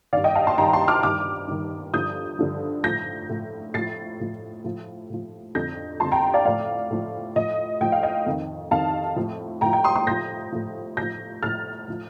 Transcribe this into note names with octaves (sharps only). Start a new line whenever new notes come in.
G2 D#3 D5 F5
D#5 G5
F5 A5
A5 C6
G2 D#3 G5 A#5
A5 C6
D6 F6
G2 D#3 D6 F6
G2 D#3
G2 D3 F3 D#6 G6
G2 D3 F3
A2 F3 G6 A#6
A2 F3
A2 F3 A6 C7
A2 F3
A2 F3
A2 F3
F2 D3 F3 G6 A#6
F2 D3 F3 A5 C6
G5 A#5
D5 F5
A2 F3 D5 F5
A2 F3
A2 F3 D#5
A2 F3 G5
F5
D#5 G5
F2 D#3
F2 D#3 F5 A5
A2 F3
A2 F3 G5 A#5
G5 A#5
C6 D#6
C6 D#6
A2 F3 G6 A#6
A2 F3
A2 F3 G6 A#6
A2 F3 F6 A6
A2 F3